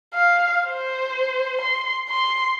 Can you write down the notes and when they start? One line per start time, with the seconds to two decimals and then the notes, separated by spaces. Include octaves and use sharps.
0.14 F5
0.67 C5
1.61 C6
2.09 C6